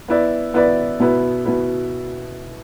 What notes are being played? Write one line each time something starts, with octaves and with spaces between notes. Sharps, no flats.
B3 E4 B4 D5
B3 E4 B4 D5
B2 B3 E4 B4
B2 B3 E4 B4